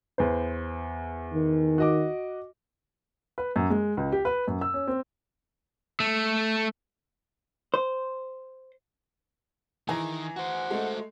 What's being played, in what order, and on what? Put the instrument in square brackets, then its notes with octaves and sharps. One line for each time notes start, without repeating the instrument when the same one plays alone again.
[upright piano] E2 B4 C5
[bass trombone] D#3
[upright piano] F#4 D#5 D6
B4
F#2
G#3
C#2
G4
B4
F#2
E6
C#4
C4
[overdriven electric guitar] A3
[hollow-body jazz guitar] C5
[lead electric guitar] D#3 [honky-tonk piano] E3 G#4 A#5
[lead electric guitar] F#4 C5 [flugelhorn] F#5
[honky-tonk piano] G#3 A3